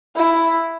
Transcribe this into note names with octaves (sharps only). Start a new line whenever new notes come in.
E4